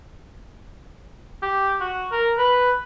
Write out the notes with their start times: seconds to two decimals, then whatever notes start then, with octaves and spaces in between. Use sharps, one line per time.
1.43 G4
1.81 F#4
2.12 A#4
2.38 B4